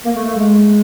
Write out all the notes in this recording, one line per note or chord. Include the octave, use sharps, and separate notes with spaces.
A#3
A3
A3
G#3